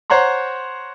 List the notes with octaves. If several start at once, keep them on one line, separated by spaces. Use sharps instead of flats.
C5 C#5 F#5 A#5 C6